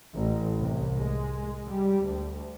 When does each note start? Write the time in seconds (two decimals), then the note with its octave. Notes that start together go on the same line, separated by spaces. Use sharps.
0.14 A1
0.59 C2
0.97 G#3
1.67 G3
2.06 D2